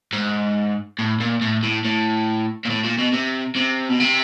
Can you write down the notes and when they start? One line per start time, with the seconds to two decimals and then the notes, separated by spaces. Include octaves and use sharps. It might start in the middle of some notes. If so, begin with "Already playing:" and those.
0.13 G#2
0.99 A2
1.20 A#2
1.42 A2
1.63 A2
1.85 A2
2.65 A#2
2.70 A2
2.84 A#2
2.99 B2
3.13 C3
3.56 C3
3.89 B2
4.00 C3